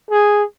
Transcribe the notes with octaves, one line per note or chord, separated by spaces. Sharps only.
G#4